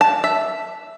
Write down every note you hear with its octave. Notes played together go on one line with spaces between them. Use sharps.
A5
E5